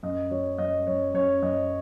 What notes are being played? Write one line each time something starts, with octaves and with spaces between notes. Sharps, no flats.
F#2 D#5
F#3 C#5
F#2 D#5
F#2 C#5
F#2 C#5
F#2 D#5